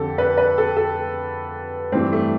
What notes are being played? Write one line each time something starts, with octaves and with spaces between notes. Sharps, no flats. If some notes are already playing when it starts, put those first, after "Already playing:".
Already playing: F2 D3 G4 A4
B4
B4
A4
A4
G2 E3 C4
A3